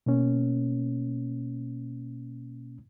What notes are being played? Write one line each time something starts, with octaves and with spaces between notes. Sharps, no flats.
B2 A#3 C#4